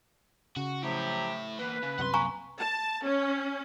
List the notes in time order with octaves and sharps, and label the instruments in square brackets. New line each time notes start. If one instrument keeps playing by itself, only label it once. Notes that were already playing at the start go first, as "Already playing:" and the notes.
[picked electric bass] C#3 [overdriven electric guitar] F#4
[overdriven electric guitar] A2 E4 [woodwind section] F3 F#3 G4
[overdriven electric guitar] E2 A#3 [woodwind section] B4
[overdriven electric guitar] C#3
[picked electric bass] C2 F#2 C3 [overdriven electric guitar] F#5 C6
[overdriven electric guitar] A#3 [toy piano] G#5 A#5 C#6
[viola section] A5
C#4